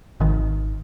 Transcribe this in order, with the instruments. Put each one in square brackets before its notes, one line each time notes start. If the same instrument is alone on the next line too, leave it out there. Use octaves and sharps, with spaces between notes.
[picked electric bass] G#1 D#3